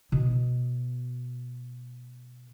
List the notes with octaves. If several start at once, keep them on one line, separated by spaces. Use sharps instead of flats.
B2 B3